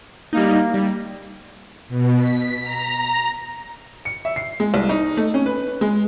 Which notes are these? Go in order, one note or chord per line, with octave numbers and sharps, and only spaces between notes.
G3 A#3 D#4
G3
B2
B6
A#5
C#7
E5
C7
G#3
C2
D#4
A3
C#4
B4
G#3